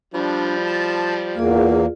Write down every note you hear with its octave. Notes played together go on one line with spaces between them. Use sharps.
F3 G3 D4 B5
A5
E2 A#3 F4 G#4 D5